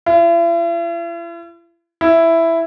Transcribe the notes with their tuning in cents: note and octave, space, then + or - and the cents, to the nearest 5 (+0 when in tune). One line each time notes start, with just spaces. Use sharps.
E4 +45
E4 +5